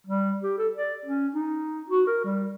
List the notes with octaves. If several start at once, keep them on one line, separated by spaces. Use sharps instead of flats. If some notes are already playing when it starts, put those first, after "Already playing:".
G3
G4
A4
D5
C#4
D#4
F#4
A#4
G3